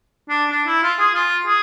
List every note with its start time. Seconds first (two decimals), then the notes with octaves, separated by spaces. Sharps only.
0.29 D4
0.51 D4
0.67 E4
0.83 F4
0.99 G#4
1.14 F4
1.47 G#4